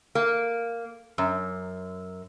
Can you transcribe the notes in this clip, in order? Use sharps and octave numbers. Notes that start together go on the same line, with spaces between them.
A#3
F#2